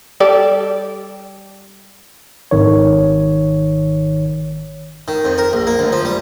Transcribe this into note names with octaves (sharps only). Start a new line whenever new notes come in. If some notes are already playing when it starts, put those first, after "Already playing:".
G3 A4 D5
G#1 D#3 C#5
D#3
F2
A#4
A#1
A#3
D2
F3
G3